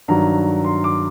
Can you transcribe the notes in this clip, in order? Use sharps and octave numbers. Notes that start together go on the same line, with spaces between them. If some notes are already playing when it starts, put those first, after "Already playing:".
G2 D#3 F#3 A#5
C6
D6